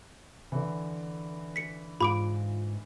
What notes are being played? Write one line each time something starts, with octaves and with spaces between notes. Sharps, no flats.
D3 E3
B6 C#7
G#2 F4 B5 D6 D7